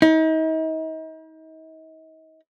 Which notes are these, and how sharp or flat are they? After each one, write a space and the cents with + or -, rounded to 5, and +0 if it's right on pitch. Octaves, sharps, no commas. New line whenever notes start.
D#4 +40